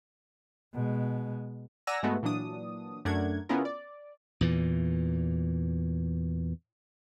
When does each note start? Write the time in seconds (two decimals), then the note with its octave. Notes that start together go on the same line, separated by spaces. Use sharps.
0.73 B2 G#3
1.87 D5 F#5 G#5 A#5 E6 A#6
2.03 G#2 G#3 A3 B3 F#4
2.23 A#2 E3 F#3 D4 D#6
3.05 F#2 A3 D4 A#4 F#5 G#6
3.49 C#3 B3 C#4 E4 F4 A#4
3.65 D5
4.41 E2 A#2 E3